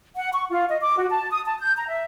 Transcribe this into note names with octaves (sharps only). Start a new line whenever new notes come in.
F#5
C#6
F4
D#5
D6
F#4
A5
D#6
A5
G6
A#5
E5